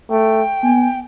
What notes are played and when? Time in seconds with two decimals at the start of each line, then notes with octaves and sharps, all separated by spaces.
0.10 A3 G5
0.63 B3 G#5